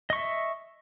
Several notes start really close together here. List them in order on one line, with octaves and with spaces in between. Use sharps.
D#5 C#6 E5